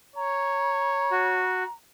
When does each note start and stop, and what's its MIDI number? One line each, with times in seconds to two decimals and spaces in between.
0.16 1.46 73
0.16 1.72 82
1.11 1.63 66